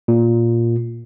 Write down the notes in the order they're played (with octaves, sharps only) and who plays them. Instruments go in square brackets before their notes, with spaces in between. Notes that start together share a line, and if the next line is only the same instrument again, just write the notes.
[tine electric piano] A#2